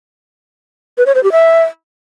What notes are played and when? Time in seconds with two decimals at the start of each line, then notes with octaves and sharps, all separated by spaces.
0.98 B4
1.06 C#5
1.15 C5
1.23 G4
1.32 E5